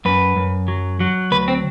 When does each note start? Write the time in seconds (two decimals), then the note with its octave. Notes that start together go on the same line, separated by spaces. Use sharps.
0.05 F#2 B4
0.36 F#2
0.68 F#3
1.00 F#3
1.31 D2 B4
1.48 C4